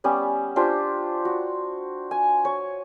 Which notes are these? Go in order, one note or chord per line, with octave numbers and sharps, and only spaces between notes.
G3 B3 C#4
D4 F4 G4 C5
F#4
G#5
C#5